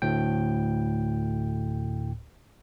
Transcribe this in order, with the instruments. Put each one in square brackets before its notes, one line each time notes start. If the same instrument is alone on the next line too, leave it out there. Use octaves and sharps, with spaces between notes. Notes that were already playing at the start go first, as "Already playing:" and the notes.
[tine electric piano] D2 A2 G5